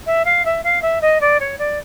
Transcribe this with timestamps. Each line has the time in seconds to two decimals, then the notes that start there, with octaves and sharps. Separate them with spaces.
0.06 E5
0.25 F5
0.45 E5
0.64 F5
0.82 E5
1.01 D#5
1.21 D5
1.40 C#5
1.58 D5